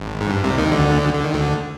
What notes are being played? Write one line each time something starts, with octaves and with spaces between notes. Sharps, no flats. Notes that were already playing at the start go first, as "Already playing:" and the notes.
Already playing: G#1
G#2
G2
C2 C3
D#2 D#3
D2 D3
D3
D#3
D2 D3